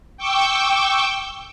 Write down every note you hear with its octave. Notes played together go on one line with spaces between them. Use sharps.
G5 C#6 D6 E6 G6